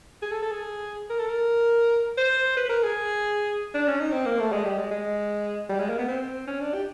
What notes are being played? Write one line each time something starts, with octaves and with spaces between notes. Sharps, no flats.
G#4
A4
A4
G#4
A#4
A4
A#4
C5
B4
A#4
G#4
D4
C#4
D#4
C4
A#3
A3
G#3
G3
G#3
G#3
G3
G#3
A#3
B3
C4
C#4
D4
G4